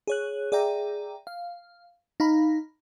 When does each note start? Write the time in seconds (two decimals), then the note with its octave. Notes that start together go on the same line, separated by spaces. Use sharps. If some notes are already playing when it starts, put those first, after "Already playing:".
0.07 G#4 C#5 F#6
0.52 G#4 D5 E5 G5 A#5
1.27 F5
2.20 D#4 F5 A#5 B5